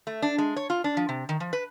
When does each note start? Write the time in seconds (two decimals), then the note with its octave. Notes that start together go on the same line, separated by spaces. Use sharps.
0.07 A3
0.22 D4
0.38 G#3
0.56 C#5
0.70 F4
0.84 D4
0.97 F3
1.09 C3
1.29 D#3
1.40 F3
1.53 B4